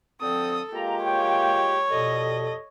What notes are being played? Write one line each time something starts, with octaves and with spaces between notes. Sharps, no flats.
D3 F3 C4 A4 D#6
G#3 A#3 F4 G4 A#5
C#5 G5
F2 B2 G3 A4 D#5